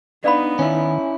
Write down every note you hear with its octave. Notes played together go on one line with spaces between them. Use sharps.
B3 D4 D#4 D5 F5 B5
D#3 C#4 E4